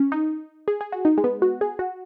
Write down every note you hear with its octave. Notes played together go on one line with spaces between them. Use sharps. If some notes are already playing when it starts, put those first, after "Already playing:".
Already playing: C#4
D#4
G#4
G#4
F#4
D#4
G#3
B3
F#4
G#4
F#4